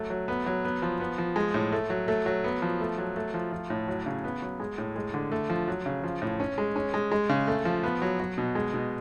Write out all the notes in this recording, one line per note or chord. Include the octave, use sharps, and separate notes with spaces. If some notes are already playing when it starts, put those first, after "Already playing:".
Already playing: F#3 A3
F#3
B3
F#3
B3
F3
B3
F3
G#3
A2
A3
F#3
A3
F#3
B3
F3
A3
F#3
A3
F3
F3
A2
F#3
C#3
B3
F#3
G#3
A2
G#3
D3
A3
F3
F#3
C#3
F3
A2
C#4
G#3
C#4
G#3
G#3
C#3
A3
F3
B3
F#3
F#3
B2
G#3
B2